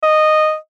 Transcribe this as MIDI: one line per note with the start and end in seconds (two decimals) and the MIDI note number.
0.03 0.56 75